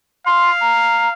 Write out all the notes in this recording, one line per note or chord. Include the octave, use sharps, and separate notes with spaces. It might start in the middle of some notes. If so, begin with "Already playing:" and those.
F5 C6
A#5